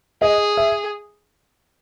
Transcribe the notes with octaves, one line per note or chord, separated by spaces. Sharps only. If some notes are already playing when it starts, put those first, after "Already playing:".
G#4 D#5
E5